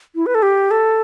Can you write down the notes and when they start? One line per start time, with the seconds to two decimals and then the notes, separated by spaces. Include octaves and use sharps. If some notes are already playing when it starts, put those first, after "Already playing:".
0.16 E4
0.26 B4
0.35 A4
0.43 G4
0.71 A4